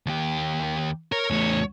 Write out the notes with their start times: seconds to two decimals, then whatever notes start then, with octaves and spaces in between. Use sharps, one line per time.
0.06 D#2 G4
1.12 A#4 C#5
1.30 E2 A3